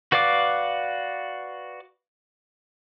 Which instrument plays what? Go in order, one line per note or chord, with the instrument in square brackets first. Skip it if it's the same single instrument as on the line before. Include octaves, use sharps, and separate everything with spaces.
[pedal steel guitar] F#4 B4 D5 F5 D6